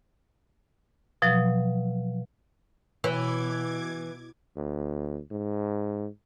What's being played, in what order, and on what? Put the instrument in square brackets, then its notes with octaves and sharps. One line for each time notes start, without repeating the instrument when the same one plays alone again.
[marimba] B2 F3 F#3
[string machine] B2 D6 G#6 [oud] E3
[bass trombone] D2
G#2